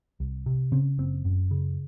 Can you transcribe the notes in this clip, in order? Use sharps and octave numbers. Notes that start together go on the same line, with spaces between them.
C2
C3
C#3 C4
F#1 C4
F#2
C#3